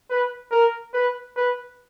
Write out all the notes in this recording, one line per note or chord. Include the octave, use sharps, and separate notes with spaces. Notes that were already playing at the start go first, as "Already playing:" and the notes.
B4
A#4
B4
B4